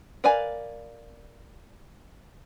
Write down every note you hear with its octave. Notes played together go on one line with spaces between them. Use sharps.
A#4 B4 D5 F5 G#5